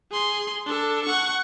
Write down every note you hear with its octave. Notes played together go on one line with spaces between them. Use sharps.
G#4 C6
D4 A4
F#5 C#6